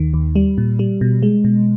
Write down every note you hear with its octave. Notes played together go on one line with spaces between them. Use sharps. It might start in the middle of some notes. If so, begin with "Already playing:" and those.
Already playing: D#2 D#3
D#2
G3
A#2
G3
B2
G#3
B2